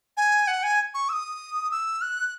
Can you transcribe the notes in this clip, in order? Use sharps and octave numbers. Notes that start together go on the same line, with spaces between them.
G#5
F#5
G#5
C#6
E6
D#6
E6
F#6